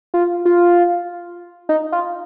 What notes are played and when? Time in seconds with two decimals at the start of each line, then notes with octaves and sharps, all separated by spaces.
0.14 F4
0.45 F4
1.69 D#4
1.92 F4